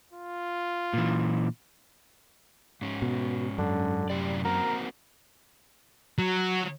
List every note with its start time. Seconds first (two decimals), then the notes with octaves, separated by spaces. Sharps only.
0.13 F4
0.93 A#2 E3
2.81 G#2 C#4
3.02 B2
3.58 F#2 D3
4.10 A2 C3 G3 D5
4.45 A#3 C4 F#4 A#4
6.18 F#3